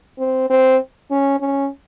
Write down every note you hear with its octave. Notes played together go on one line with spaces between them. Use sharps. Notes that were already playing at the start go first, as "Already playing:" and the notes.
C4
C4
C#4
C#4